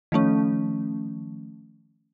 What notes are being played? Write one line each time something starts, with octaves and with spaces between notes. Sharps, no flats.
D#3 F3 A3 C#4